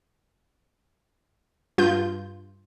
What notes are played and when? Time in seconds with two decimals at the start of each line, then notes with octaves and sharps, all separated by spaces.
1.78 G2 F4 G6